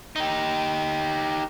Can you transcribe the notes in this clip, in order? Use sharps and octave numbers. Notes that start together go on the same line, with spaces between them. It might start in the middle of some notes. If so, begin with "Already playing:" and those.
D#4 G4